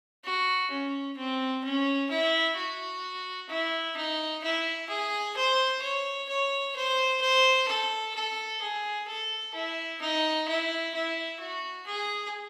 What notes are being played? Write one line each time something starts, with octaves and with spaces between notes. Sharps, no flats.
F#4
C#4
C4
C#4
E4
F#4
E4
D#4
E4
G#4
C5
C#5
C#5
C5
C5
A4
A4
G#4
A4
E4
D#4
E4
E4
F#4
G#4